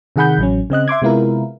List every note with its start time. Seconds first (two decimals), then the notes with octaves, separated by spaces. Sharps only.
0.16 C3 D#3 G#4 F#5 B5 G6
0.38 A1 F#3 C#4
0.70 C#3 C4 D#5 F#6
0.88 E5 C6 D6 G#6
1.02 C3 G#3 B3 E4 F4 A#4